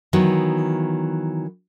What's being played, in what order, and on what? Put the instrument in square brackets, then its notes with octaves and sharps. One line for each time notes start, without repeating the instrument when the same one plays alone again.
[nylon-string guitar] D#3 E3 F#3 B3